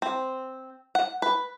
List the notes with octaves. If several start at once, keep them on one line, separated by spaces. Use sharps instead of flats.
C4
F#5
B4